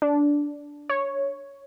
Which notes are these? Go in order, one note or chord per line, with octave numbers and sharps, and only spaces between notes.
D4
C#5